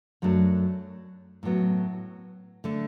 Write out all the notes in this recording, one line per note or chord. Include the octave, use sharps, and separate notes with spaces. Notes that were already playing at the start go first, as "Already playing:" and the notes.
F#2 F#3 A3 D4
A2 F#3 B3
D3 A3 D4